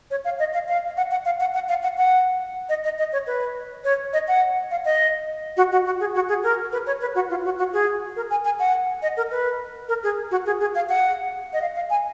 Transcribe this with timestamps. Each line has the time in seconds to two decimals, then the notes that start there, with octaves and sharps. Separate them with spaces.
0.11 C#5
0.25 F5
0.39 D#5
0.54 F5
0.68 F5
0.97 F#5
1.11 F#5
1.25 F5
1.40 F#5
1.54 F#5
1.69 F5
1.83 F#5
1.98 F#5
2.69 D#5
2.84 D#5
2.99 D#5
3.13 C#5
3.27 B4
3.84 C#5
4.13 D#5
4.28 F#5
4.71 F5
4.85 D#5
5.57 F#4
5.72 F#4
5.86 F#4
6.00 G#4
6.15 F#4
6.29 G#4
6.43 A#4
6.72 B4
6.87 C#5
7.01 B4
7.15 F#4
7.30 F4
7.45 F#4
7.58 F#4
7.73 G#4
8.16 A#4
8.30 G#5
8.45 G#5
8.59 F#5
9.02 D#5
9.17 A#4
9.31 B4
9.89 A#4
10.03 G#4
10.31 F#4
10.46 G#4
10.61 G#4
10.75 F5
10.89 F#5
11.53 D#5
11.61 F5
11.76 F5
11.90 G#5